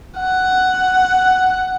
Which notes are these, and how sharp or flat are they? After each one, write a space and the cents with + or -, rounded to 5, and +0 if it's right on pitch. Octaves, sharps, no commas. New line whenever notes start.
F#5 +10